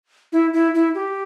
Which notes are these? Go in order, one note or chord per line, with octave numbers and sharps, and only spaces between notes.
E4
E4
E4
G4